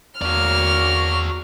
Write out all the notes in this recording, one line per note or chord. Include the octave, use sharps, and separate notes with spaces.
E2 A#3 F#4 A#4 D5 C#6 F6